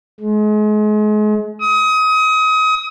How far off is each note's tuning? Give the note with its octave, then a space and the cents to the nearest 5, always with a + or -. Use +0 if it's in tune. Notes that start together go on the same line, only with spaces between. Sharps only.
G#3 +35
D#6 +30